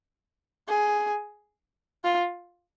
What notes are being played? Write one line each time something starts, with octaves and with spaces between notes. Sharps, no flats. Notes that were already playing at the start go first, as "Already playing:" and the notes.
G#4
F4